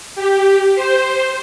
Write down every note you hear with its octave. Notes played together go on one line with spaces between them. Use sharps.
G4
C5